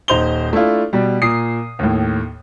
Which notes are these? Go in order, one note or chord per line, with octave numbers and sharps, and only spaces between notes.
D#1 D#4 C5 F7 G7
A3 D4 E4 F4
B2 G3
A#2 D#6 C7
D#2 A2